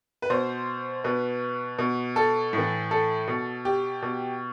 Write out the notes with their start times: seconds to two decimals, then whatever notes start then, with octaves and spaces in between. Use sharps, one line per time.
0.22 B4
0.30 B2 C5
1.04 B2 B4
1.79 B2
2.16 A4
2.53 A2
2.58 E3
2.91 A4
3.28 B2
3.65 G4
4.02 B2